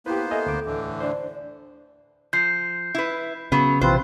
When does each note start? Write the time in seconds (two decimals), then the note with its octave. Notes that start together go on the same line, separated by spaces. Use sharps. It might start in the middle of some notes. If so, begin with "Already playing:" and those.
0.06 A#3 B3 E4 G4 B4 C5
0.31 A4 D#5 E5 G#5
0.46 D2 D6
0.66 A2 D3 E3
1.00 D4 C5 D5
2.33 F3 G6 C7
2.94 E4 B4
3.52 C#3 F#3 B3
3.81 A#1 C3 E3 C4 F4 B4 C5